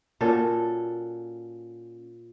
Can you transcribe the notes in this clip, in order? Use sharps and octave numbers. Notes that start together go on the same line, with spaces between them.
A#2 C#4 F#4 A4